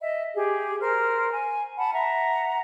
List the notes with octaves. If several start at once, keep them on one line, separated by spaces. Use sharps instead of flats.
D#5 E5
G4 G#4
A#4 C5 F6
G#5
F#5 A5 B5
E5 F#5 A#5